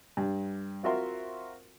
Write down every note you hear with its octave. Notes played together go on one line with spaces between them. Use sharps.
G2
C4 F4 F#4 A#4 E5 C6